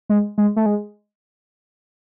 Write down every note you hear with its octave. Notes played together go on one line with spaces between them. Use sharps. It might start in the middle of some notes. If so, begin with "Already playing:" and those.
G#3
G#3
A3
G#3